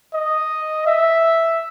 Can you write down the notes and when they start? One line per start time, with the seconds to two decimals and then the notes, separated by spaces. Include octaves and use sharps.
0.14 D#5
0.87 E5